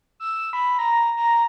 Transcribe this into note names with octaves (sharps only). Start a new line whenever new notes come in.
E6
B5
A#5
A#5